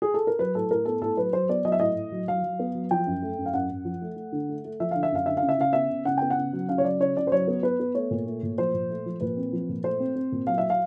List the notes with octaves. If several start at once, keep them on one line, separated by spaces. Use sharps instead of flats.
G#4
A4
A#4
F#3 B4
A2 A4
A2 A#4
B3 A4
A2 A4
F#3 B4
F#3 C5
B3 D5
F#3 D#5
E5
A2 D#5
A2
F#3
F#3 F5
F#3
B3
F#3
F3 G5
F#2
A3
F#2
F5
F#2 F#5
F#2
F3
A3
A3
D3
A3
A3
F3 E5
D3 F5
E5
F#2 F5
D3 E5
F5
C#3
E5
C#3 F5
B3 E5
C#3
C#3 F#5
B3 G5
F#5
C#3
F#3
C#3 F5
C#5
F#3 D5
C#3 C#5
C#3 D5
C5
F#3 C#5
B3
B3 B4
B3
A3 C#5
A#2
A3
A#2
F3 C5
A#2
A3
F3
A#2 B4
C4
F3
A#2
A3 C5
C4
C4
A#2
F#3 F5
E5
F5